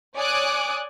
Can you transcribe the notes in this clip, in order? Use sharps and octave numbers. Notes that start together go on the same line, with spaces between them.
C#5 D5 G#5 D6 D#6 F#6